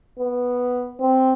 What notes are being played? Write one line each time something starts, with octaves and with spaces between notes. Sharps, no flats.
B3
C4